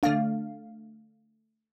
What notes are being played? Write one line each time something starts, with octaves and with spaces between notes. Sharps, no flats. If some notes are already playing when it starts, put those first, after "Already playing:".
D3 A3 D4 F5